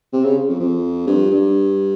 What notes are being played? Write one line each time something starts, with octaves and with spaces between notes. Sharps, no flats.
C3
C#3
F2
F2
G2
G2